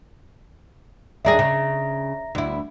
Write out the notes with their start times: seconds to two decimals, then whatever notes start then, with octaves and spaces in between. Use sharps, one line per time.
1.25 D#2 D4 G#4 E5 A#5 A#6
1.39 C#3
2.35 D2 E4